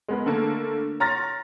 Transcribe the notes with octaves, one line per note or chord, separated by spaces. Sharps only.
G#3 B3 A#4
D3 A3 A#3
C#5 A#5 C6 F6 A6 A#6